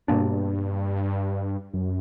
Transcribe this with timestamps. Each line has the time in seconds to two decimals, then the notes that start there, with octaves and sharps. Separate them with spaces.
0.08 G2 B2 A#3 D4
1.74 F#2